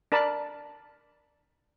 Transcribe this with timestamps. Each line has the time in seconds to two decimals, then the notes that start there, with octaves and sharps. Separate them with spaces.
0.12 D4 A#4 D5 A5 B5